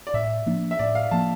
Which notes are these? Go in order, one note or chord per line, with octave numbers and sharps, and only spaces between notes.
D5
A2 E5
F3 A#3 D4
E5
A2 D5
F5
F3 A#3 D4 A5